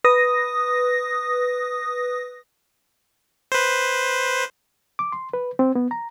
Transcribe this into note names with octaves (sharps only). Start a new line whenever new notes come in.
B4 D#6 A#6
B4 C5
D6
C6
B4
C4
B3
A#5